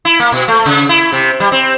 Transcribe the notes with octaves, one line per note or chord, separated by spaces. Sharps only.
E4
A#3
B2
A3
C#3
E4
C3
G3
C4